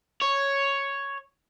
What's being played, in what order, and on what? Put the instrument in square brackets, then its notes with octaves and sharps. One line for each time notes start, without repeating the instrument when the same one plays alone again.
[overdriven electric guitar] C#5